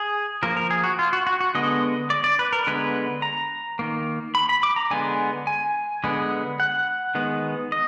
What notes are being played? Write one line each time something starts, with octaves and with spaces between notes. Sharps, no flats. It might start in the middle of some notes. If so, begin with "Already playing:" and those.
Already playing: G#4
F3 A#3 A#4
A#4
G#4
F#4
F4
F#4
F#4
F#4
D3 G#3 B3 D#5
D5
D5
B4
A#4
D3 G#3 B3 B4
A#5
D#3 A#3
B5
B5
D6
A#5
D3 G#3 B3 G#5
G#5
D3 G#3 B3
F#5
D#3 G#3 B3
D#5